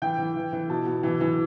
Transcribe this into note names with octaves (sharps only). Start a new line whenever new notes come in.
E3 G5
E3
E3
E3
B2 A5
B2
E3
E3